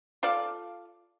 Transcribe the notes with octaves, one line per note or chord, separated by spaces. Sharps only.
F4 A4 D5 F5